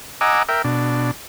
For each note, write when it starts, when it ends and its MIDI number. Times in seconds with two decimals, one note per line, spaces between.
0.21 0.43 75
0.21 0.43 78
0.21 0.43 80
0.21 0.43 82
0.21 0.43 86
0.21 0.43 88
0.49 0.62 70
0.49 0.62 76
0.49 0.62 79
0.64 1.11 47
0.64 1.11 62